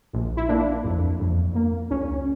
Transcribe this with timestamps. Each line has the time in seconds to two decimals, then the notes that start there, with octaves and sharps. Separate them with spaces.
0.13 A#1
0.37 E4
0.49 A#3 D4
0.84 F2
1.19 F2
1.55 A#3
1.91 C#2 C#4